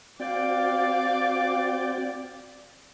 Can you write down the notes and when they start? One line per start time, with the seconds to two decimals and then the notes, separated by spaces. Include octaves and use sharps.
0.20 C4 F#4 D5 F5 G5 D6